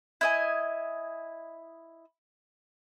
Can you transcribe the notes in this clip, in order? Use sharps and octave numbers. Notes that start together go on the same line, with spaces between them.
E4 D#5 G#5